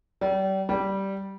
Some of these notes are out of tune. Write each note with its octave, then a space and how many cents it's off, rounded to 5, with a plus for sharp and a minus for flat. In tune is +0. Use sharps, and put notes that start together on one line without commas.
G3 -35
G3 -10